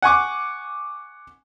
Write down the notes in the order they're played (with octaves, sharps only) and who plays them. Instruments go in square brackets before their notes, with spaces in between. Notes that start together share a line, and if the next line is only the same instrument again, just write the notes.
[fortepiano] F#5 G#5 C#6 D6